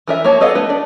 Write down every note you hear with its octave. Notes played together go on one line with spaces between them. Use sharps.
E3 A#4 E5
A#3 C#5 A5
B3 A4 D#5 F5 F#5
A3 B4
D4 D5